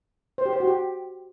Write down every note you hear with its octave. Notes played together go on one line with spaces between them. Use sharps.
C5
G4
C5
F#4
G4